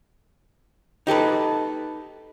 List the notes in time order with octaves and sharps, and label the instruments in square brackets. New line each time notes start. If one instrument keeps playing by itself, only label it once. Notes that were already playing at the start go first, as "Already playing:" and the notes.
[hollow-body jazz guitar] D#4 G4 A4 B4